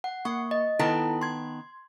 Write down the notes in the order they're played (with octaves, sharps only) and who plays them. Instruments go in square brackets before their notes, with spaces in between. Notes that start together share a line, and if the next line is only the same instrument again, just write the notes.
[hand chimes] F#5
[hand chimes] A#3 C#6 [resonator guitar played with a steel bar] F#5
[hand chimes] D#5
[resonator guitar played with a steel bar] D#3 B3 A5 [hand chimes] E4 A4 A#5
[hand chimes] C6 G#6